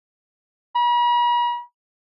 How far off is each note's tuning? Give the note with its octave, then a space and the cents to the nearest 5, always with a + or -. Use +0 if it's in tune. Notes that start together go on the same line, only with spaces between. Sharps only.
B5 -45